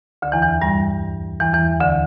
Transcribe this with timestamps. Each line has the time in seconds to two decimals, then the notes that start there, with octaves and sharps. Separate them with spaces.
0.22 D2 D3
0.32 E2 E3
0.42 E2 E3
0.62 G2 G3
1.40 E2 E3
1.53 E2 E3
1.80 D2 D3